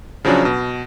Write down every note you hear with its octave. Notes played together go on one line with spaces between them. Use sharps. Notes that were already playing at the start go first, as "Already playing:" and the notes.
C#3 F3 F#3 C#4 D4
B2